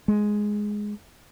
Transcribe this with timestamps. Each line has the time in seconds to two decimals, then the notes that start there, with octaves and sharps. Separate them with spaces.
0.08 G#3